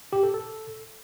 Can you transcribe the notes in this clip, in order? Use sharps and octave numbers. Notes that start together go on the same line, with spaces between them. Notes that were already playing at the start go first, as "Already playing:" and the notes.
G4
A4
A4